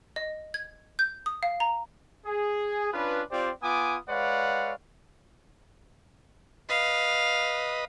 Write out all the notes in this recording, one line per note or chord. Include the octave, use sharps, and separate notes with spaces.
D#5
G#6
G6
D#6
F5
A#5
G#4
C#4 D4 F4 B4
C4 F4 G4 C5 D5
B3 F4 G#5 D6 D#6
G#3 B4 C#5 D5 F5 F#5
B4 D#5 F5